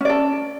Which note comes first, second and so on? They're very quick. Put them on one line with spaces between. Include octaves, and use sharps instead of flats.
C#4 D5 A4